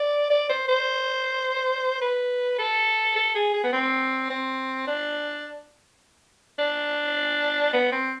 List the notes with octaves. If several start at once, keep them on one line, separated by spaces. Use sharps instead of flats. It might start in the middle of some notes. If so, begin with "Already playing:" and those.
Already playing: D5
D5
C5
C5
B4
A4
A4
G#4
G#4
B3
C4
C4
D4
D4
B3
C4